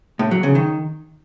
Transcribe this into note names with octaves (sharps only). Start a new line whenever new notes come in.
A2
F#3
C#3
D#3